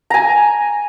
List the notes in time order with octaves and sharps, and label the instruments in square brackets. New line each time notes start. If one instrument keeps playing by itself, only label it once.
[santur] G#5 A#5